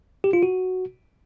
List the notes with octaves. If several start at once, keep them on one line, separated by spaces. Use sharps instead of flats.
G4
F4
F#4